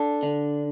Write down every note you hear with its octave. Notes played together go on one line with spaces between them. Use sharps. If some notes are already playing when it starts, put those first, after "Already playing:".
Already playing: D4 A4
D3